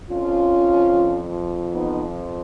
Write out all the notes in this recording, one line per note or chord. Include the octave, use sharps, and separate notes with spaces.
F2 F3 C#4 F4
B3 D#4